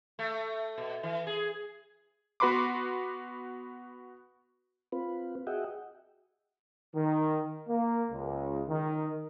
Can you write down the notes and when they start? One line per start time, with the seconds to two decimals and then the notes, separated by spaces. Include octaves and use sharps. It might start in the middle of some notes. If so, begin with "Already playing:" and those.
0.19 A3
0.78 B2
1.03 E3
1.27 G#4
2.40 B3 F#4 B4 B5 C6 D6
4.92 C4 F4 B4
5.47 F#4 G#4 D#5 E5 F#5 G5
6.95 D#3
7.68 A#3
8.11 C#2
8.69 D#3